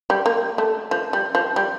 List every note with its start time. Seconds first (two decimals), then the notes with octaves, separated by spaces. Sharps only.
0.10 G3
0.26 A#3
0.58 A3
0.91 F3
1.13 G3
1.35 F3
1.56 G3